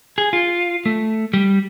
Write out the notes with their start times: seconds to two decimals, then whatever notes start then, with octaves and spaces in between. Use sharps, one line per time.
0.18 G#4
0.33 F4
0.86 A3
1.34 G3